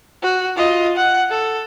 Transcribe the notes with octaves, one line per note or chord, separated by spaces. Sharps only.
F#4
F4 D#5
F#5
A4